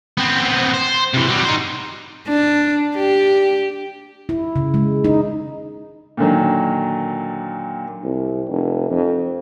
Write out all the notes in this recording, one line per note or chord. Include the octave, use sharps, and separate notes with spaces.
B3 C4
C5
C3 E3
F#3 G3
D#4 C5
D4
G4
E4
C#3
G#3
D#4
A#2 D3 D#3 F#3
C2
F1
F2